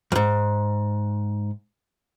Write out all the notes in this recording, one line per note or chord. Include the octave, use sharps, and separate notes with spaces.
F2 G#2